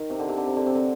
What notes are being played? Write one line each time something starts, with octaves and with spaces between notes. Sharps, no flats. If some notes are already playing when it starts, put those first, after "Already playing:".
Already playing: D#3
C3
D3
C3
D3
C3
D3
C3
D3